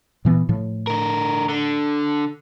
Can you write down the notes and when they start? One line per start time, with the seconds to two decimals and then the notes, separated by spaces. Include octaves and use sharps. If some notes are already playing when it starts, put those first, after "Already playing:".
0.25 A#2 E3 B3
0.49 A2 F3
0.87 D3 A#4
1.49 D3